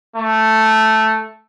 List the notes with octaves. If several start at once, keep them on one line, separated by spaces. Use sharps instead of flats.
A3